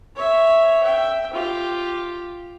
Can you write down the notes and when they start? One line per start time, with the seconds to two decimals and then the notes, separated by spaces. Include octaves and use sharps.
0.16 C#5 E5
0.83 E5 G5
1.33 F4 G4